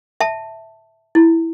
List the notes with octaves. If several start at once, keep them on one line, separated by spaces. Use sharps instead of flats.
E5 A5
E4